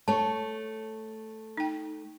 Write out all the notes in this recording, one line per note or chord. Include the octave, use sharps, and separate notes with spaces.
A3 C#5 A5
D#4 G5